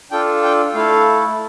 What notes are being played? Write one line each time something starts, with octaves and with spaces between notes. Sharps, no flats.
D4 F4 A4 G5
G5
A3 E4 A4 F5